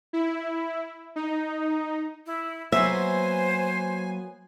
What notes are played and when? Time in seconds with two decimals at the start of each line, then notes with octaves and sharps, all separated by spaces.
0.13 E4
1.16 D#4
2.26 E4
2.72 F#3 A#3 B3 C5 E5 G#5